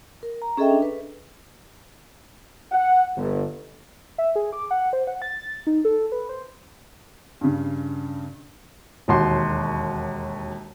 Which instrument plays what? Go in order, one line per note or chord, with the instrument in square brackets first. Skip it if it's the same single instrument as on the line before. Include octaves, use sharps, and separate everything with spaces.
[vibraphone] A#4
A#5
C#4 G#4 A4 D#5 E5 G5
D4
B4
[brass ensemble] F#5
G1
[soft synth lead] E5
G#4
D6
F#5
C5
F#5
A6
D#4
A4
B4
C5
[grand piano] G2 C#3
[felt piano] E1 D#2 F#4 C6